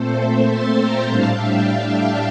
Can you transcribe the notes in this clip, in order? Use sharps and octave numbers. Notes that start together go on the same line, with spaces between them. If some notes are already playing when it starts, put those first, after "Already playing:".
Already playing: A#2 A3 C4 A4 C5
C5 E5
A5 C6
G5 A#5
A2 G3 D4 F5 A5
E5 G5
E5 G5